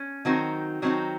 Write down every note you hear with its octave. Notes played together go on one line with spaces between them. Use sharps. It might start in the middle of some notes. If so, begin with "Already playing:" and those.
Already playing: C#4
D#3 F#3 C4 D#4 F#4
D#3 F#3 C4 D#4 F#4